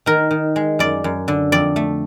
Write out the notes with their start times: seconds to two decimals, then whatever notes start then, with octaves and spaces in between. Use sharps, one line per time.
0.06 D#3 A#4
0.31 D#3
0.56 G#3
0.79 F#2 D5
1.04 F#2
1.28 D3
1.52 F2 D5
1.76 A3